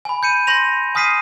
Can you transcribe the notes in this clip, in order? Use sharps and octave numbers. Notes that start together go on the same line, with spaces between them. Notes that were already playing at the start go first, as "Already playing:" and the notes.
G#5 B5
G6 C#7 D#7
C6 G6 A#6 F7
G#5 D#6 F6 B6 C7 D#7